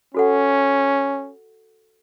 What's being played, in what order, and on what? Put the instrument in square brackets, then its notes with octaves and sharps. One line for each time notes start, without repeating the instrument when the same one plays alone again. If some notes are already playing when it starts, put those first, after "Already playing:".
[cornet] C#4 [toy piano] F#4 A4 F#5